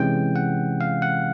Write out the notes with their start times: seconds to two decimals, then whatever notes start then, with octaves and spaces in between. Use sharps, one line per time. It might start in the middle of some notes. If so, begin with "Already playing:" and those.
Already playing: C3 E3 G#3 C#4 G5
0.36 F#5
0.81 F5
1.02 F#5